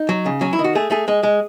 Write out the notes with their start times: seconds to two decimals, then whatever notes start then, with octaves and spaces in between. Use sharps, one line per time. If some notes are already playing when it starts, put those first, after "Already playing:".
Already playing: D#4
0.09 F#3
0.26 C#3
0.41 F#3 C#4
0.53 E4
0.59 D#3
0.64 F#4
0.75 A3 G#4
0.91 A3 G#4
1.08 G#3 G#4
1.23 G#3